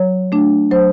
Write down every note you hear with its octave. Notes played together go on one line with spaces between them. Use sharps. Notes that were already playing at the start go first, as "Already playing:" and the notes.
Already playing: F#3 C#5
A3 D4
F#3 C5